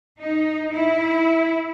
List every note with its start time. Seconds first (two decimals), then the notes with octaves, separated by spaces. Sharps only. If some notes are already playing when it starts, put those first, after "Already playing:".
0.20 D#4
0.73 E4